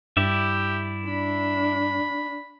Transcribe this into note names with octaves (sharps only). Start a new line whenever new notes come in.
G2 E4 G4 D5 E5
D4 B5